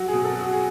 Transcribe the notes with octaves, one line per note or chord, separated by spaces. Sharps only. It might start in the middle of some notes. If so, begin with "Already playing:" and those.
Already playing: F#3 F#4
B2 G#4
A4
F#3
F#4
G#4